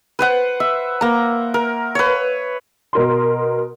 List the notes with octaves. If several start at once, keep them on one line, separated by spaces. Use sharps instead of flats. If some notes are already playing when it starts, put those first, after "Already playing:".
B4 C5 F#5
E5
A#3 A#5
A#4
B4 C#5
B2 A#4 C6